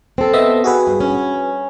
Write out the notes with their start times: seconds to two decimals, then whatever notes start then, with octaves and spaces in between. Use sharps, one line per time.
0.18 C4 A4
0.33 B3 D#5 E5
0.64 F#4 G#4 B4
0.87 G2
1.00 C#4